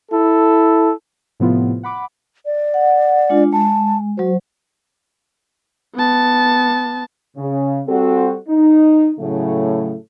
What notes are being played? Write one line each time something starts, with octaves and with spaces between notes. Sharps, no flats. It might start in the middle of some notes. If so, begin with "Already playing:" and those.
E4 A4
A2 C3 F3 B3 E4 F4
F#5 B5 D6
D5
F#5
G#3 D4 F4
G#3 A5
F#3 F#4 C5
B3 A5
C#3
G3 C4 F#4 A4
D#4
A2 C#3 F#3 A3